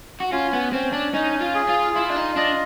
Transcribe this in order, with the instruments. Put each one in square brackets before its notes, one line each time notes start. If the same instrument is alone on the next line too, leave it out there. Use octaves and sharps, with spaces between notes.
[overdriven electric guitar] F#4
[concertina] C#4 [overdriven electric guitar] F4
[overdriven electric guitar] B3
[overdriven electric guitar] C4 [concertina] C#4
[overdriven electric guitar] D4
[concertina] C#4 [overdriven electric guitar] D#4
[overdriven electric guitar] F4
[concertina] G#4
[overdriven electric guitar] F4
[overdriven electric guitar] E4 [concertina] F4
[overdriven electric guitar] D4
D#4
[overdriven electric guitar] D4 [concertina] D#5